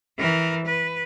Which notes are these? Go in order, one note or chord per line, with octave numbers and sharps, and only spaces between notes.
E3 A#4
B4